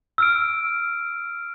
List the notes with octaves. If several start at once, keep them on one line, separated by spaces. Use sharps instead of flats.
E6 F6 D7